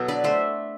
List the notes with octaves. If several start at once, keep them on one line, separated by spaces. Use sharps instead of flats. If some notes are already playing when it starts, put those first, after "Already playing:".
Already playing: B2 F#3 A4
D4 B4 D5
A3 C5 E5